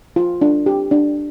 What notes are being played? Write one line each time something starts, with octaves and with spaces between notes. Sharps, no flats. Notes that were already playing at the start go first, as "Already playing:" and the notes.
F4
D4
G4
D4